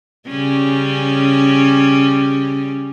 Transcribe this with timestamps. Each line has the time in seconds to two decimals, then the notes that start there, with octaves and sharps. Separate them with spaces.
0.28 C#3 G3 C#4